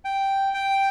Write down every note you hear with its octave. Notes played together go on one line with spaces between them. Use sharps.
G5
G5